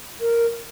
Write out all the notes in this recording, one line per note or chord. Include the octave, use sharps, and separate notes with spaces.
A#4